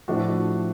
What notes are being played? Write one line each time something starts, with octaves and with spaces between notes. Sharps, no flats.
A2 F3 A3 D4 F#4